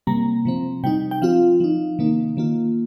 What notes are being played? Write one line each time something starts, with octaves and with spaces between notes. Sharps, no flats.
C3 G3 A#3 A#5
C3 F3 C4
C3 G3 D#4 G5
G5
F3 C4 F4 F5
F3 D#4
C3 D#3 A#3 D#4
D#3 A#3 F4